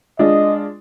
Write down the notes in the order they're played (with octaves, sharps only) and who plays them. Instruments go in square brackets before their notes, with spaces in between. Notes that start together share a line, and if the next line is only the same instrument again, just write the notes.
[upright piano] G#3 D4 F4 [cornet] D#5